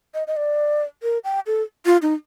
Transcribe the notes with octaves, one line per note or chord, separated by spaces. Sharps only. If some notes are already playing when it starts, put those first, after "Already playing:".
D#5
D#5
D5
A#4
G5
A4
F4
D#4